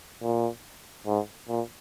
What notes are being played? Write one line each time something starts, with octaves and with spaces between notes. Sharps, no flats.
A#2
G#2
A#2